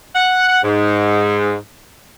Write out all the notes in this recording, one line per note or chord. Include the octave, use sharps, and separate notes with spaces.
F#5
G#2